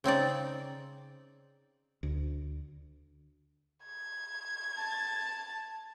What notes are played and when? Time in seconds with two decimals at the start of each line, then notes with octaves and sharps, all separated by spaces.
0.04 C#3 C4 D#4 D5
2.03 D2
3.85 G#6
4.77 A5